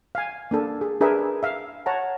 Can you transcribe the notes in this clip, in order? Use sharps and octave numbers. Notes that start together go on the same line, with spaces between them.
F5 G#5
A#3 D4 A4
G#4
D4 G#4 A#4 B4 E5
E5 F5
C#5 F#5 A5 A#5